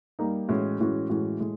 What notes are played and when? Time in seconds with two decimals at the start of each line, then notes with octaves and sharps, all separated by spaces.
0.19 G3 A#3 D#4
0.48 A2 E3 G#3 C#4 F#4
0.80 A2 E3 G#3 C#4 F#4
1.10 A2 E3 G#3 C#4 F#4
1.40 A2 G#3